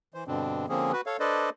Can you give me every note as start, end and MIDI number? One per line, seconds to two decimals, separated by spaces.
0.14 0.24 52
0.14 0.24 72
0.27 0.66 43
0.27 0.66 47
0.27 0.66 50
0.27 0.66 60
0.27 0.66 62
0.69 0.92 50
0.69 0.92 53
0.69 0.92 58
0.69 0.92 60
0.69 0.92 61
0.69 0.92 68
0.92 1.01 66
0.92 1.01 71
1.06 1.17 69
1.06 1.17 73
1.06 1.17 77
1.20 1.50 62
1.20 1.50 69
1.20 1.50 71
1.20 1.50 72
1.20 1.50 74
1.20 1.50 75